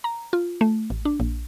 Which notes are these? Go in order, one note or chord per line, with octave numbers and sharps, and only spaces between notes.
A#5
F4
A3
A1
D4
A#1